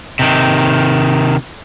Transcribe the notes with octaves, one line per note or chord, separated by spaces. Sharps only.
C3 D#3